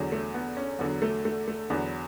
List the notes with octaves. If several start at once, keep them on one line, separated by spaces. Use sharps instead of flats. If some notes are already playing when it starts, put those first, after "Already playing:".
Already playing: E2 D3 F#3
A3
B3
C#4
E2 D3 F#3 B3
A3
A3
A3
E2 D3 F#3 B3